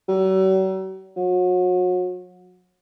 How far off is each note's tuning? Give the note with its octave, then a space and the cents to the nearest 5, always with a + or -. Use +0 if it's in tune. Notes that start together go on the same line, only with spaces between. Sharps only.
F#3 +45
F#3 -35